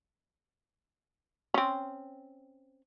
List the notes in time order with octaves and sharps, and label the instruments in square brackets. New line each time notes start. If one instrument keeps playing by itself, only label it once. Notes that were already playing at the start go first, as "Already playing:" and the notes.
[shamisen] C4 C#4